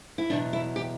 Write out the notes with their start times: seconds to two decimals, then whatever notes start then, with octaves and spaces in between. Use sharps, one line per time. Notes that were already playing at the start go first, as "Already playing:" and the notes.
0.18 E4
0.30 E2 B2 F#3 D4
0.53 E4
0.76 G4